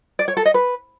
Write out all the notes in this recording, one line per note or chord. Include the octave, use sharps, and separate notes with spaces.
D5
C#5
A4
D#5
B4